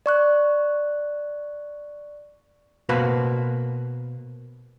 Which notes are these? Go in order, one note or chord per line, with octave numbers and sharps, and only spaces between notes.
D5 C#6 F#6
B2 A#3 F#4 B4 C5 B5